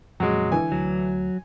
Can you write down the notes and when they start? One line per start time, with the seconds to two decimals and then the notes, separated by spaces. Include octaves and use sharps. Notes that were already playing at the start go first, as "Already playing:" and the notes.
0.20 F2 A#2 C#3 F#3 G#3
0.52 D3 E3 G#5
0.72 D2 F#3